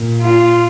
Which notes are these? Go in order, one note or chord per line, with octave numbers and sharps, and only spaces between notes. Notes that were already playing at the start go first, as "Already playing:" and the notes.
Already playing: A#2
F4